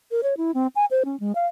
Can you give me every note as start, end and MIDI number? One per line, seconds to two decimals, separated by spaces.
0.11 0.21 70
0.23 0.37 73
0.37 0.51 64
0.54 0.67 60
0.76 0.85 80
0.91 1.03 72
1.05 1.19 61
1.20 1.32 56
1.35 1.47 77